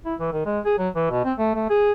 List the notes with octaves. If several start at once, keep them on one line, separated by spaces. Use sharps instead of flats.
E4
E3
D#3
G#3
G#4
F#3
E3
B2
C4
A3
A3
G#4